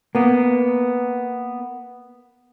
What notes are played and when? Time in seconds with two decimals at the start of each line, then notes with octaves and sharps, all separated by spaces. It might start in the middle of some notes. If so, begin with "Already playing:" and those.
0.15 A#3 B3